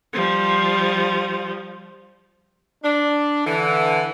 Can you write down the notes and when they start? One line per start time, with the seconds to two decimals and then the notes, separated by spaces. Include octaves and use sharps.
0.13 F3 G3
2.84 D4
3.47 D3 E3